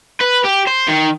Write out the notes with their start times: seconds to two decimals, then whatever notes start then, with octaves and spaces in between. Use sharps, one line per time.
0.21 B4
0.44 G4
0.67 C5
0.88 D#3